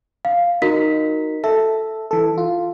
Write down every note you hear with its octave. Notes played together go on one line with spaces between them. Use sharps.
F5
D#4 F#4 A#4 B6
A4 E5
E3 A4
F4